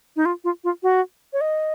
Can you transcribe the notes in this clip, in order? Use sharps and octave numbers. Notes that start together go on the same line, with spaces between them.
D#4
F4
F4
F4
F#4
C#5
D#5